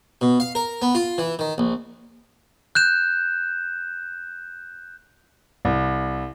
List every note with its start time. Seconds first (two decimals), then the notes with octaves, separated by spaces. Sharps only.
0.21 B2
0.40 F5
0.55 A#4
0.82 B3
0.95 F4
1.18 E3
1.39 D#3
1.58 A#1
2.75 F#6 G6 E7
5.65 C2